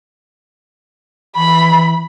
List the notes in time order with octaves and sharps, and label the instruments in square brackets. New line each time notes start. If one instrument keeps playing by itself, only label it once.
[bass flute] E3 [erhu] B5